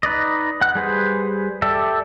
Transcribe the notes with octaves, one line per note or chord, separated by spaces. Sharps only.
D#4 B4 D5 D#5
F#5 F#6
G3 G#4 B4 C5
G4 A4 D5 E5